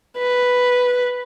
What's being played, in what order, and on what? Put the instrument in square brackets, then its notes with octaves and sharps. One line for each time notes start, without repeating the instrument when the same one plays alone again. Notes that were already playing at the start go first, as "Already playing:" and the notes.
[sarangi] B4